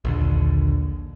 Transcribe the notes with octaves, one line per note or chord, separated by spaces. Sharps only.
A#1 D#2 D3